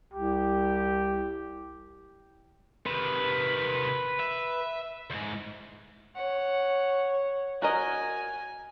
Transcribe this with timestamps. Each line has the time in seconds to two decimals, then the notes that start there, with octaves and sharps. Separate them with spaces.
0.13 C2 G4
2.86 C3 D#3 B4
4.20 E5
5.10 D2 G#2
6.16 C#5 F#5
7.62 F#4 A#4 D#5 G#5